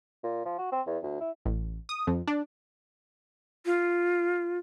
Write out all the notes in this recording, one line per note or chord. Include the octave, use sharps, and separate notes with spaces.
A#2
F3
F#4
C4
E2
D2
E4
A1
D#6
F2
D4
F4